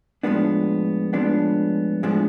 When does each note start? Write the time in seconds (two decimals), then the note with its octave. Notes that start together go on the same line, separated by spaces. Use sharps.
0.23 A2 F3 G#3 B3 D4
1.13 A2 F3 G#3 B3 D4
2.03 A2 F3 G#3 B3 D4